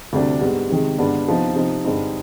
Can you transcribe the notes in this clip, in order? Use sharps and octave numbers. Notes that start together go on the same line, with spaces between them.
D2 C3 G3 D4
G#2 G3 B3
C3 D#3 G#3
G2 D3 G#3 B3 D4
C3 F3 B3 D#4
C3 F3 C4 D#4
G2 D3 G#3 C4 D#4